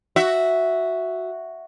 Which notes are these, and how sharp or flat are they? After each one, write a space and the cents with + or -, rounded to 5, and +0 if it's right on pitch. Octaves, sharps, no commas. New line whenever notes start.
F#4 +0 E5 +0